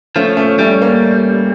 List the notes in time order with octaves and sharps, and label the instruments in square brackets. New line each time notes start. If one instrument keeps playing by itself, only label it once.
[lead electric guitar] F3 [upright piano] A3 C#4
[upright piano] A3 C#4
[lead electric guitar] G3 [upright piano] A3 C#4
[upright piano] A#3